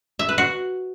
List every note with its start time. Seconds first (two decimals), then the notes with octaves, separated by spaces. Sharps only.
0.19 E5
0.29 B4
0.38 F#4